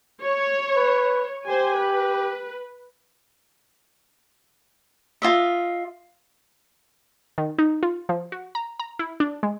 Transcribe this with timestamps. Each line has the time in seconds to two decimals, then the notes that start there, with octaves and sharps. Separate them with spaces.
0.25 C#5
0.76 B4
1.47 G4 C5 G#5
1.77 B4
5.22 F4 D#5 E5
7.38 D#3
7.58 D#4
7.83 F4
8.09 F3
8.32 F#4
8.55 A#5
8.80 A#5
8.99 E4
9.20 D4
9.43 G#3